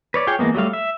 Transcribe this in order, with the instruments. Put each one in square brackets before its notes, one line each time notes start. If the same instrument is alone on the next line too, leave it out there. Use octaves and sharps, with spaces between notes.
[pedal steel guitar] B4 C#5 D5
F4 G#4 C#5 G5
E3 G#3 A#3 B3
F#3 G3 A3 F5
E5